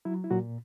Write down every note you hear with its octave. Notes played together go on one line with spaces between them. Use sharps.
F#3 E4
E4
A#2 F#3 F#4